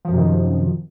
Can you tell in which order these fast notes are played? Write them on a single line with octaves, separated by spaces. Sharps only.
F3 F#2 C3 D#3